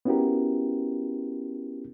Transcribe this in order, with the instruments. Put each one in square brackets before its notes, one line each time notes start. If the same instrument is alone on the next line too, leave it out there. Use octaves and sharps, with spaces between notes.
[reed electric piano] B3 C#4 E4 F#4 G4 A#4